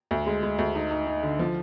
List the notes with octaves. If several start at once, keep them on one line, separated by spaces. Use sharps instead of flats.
D2
G#3
G#3
D2
D#4
D#4
D#4
D3
F3